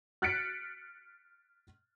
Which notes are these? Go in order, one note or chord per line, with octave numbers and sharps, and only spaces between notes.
F6 F#6 A6 B6 C#7 D7